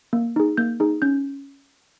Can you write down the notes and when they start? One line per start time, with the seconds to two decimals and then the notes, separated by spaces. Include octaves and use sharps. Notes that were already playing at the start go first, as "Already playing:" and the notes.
0.13 A#3
0.36 D#4 G#4
0.57 A#3 G6
0.80 D#4 G#4
1.02 C#4 G6